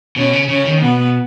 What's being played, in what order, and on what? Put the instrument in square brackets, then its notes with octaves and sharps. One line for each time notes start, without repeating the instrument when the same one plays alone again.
[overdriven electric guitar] B2 [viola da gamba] C#4
[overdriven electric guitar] C#3
[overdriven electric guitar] C#3 [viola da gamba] C#4
[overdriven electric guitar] D#3
[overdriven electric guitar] B2 [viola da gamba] B3